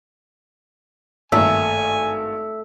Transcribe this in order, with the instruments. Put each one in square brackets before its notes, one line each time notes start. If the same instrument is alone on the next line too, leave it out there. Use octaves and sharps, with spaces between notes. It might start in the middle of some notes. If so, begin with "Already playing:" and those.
[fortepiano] G#1 G2 A#3 [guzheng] A3 [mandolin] E5 [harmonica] G#5